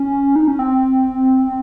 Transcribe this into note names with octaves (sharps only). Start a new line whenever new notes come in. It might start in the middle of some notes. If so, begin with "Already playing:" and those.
Already playing: C#4
D#4
C#4
C4